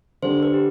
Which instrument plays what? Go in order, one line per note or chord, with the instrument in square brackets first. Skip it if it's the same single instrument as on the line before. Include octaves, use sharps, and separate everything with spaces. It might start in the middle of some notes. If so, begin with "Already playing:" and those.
[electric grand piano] D3 G3 D4 [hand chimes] C5
[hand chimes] B4
G4